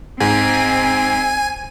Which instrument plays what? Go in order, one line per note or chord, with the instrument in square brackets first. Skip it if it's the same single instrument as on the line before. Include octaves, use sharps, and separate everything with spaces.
[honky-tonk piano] G#2 [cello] C4 [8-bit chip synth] G#5